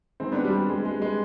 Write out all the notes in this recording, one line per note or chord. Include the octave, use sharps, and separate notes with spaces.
D#3 G#3 C4
B3 D4
G3
G3
G3 G#3
G#3
G3
G#3